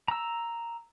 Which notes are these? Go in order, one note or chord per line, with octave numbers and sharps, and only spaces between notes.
A#5 E6